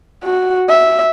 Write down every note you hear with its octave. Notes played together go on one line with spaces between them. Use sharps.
F#4
E5